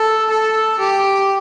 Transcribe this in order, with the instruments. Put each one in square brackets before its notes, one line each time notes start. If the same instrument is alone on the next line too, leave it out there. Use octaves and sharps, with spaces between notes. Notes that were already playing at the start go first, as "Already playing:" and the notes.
Already playing: [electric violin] A4
A4
G4